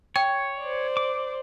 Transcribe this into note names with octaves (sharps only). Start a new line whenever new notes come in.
C#5 G5
C5 D5
D6